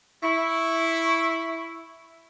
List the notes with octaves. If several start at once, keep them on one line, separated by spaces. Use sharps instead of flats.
E4 C#6